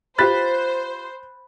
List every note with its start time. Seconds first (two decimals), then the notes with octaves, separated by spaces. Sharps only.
0.18 F4 G4 B4 C5 B5 F#6 A6 B6